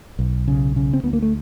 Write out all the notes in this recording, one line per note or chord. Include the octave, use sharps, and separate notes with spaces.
B1
C#3
C#3
C4
D2 B3
A#3
A3